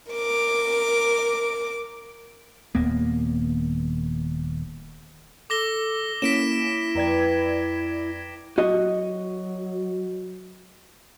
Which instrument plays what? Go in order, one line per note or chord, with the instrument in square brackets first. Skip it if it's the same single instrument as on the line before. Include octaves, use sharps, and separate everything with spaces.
[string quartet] A#4 D6
[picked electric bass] D#1 D#2 A#3 B3
[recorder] A4 [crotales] D6 A#6 G7
[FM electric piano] A#3 C#4 [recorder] E4 [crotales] B6 D7 E7
[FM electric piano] F2 D5 G#6 [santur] B4 G5 A#5
[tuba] F#3 [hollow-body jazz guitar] F#4 D#5